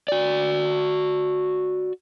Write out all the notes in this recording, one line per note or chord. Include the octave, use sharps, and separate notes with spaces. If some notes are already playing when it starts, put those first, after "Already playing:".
F#4 D5